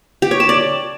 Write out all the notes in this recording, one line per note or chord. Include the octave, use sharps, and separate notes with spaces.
G4
C#5
A5
D5